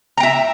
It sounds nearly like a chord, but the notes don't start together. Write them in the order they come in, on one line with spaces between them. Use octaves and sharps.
A#5 G5 E5